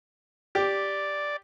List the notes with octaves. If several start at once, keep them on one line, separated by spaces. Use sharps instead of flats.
G4 D5